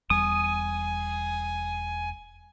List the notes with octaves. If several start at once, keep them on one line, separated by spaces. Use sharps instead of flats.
E1 E2 G3 G#5 D#6